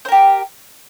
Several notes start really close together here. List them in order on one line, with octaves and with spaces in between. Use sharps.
C5 A#4 G4